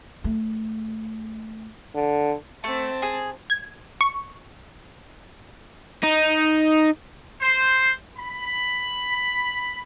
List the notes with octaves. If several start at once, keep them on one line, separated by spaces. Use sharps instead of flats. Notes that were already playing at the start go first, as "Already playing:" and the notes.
A3
D3
A3 C4 A5
G#4
G#6
C#6
D#4
C5
B5